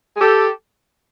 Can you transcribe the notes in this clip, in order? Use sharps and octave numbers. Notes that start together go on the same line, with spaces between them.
G#4
G4 A4